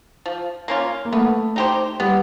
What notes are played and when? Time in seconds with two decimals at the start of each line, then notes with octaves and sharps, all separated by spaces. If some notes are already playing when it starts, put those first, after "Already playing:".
0.26 F3
0.68 A#3 C#4 F4
1.05 A#3
1.12 A3 B3
1.56 D#4 G4 C5
2.00 G3 B3